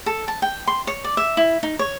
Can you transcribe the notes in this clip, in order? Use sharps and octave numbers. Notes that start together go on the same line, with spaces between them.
A4
A5
G5
C6
C#5
D5
E5
E4
D#4
C#5